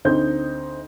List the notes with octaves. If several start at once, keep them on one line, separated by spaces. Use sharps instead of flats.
D2 C4 D#4 G6